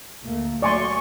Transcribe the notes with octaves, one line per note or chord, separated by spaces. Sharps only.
D2 A3 A#3
F#3 A3 D5 G#5 C6 C#6